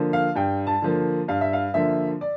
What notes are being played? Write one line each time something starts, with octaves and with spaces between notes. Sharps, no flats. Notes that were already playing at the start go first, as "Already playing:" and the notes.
Already playing: D3 F3 A#3
F5
G2 G5
A5
D3 F3 A#3
G2 F5
E5
F5
D3 F3 A#3 E5
D5